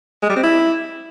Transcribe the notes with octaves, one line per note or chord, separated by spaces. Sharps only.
G#3
G3
C4
E4